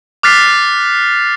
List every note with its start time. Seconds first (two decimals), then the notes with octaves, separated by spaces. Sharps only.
0.23 D6 F6 F#6 A6 B6 C7